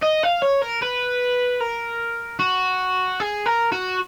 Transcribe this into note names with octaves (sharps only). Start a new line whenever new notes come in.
D#5
F5
C#5
A#4
B4
A#4
F#4
G#4
A#4
F#4